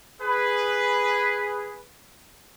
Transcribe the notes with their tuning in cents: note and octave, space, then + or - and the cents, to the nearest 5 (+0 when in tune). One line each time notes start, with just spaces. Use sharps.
G#4 -10 B4 +0